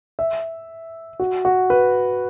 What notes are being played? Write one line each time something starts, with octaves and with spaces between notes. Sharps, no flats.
E5
F#4
F#4
B4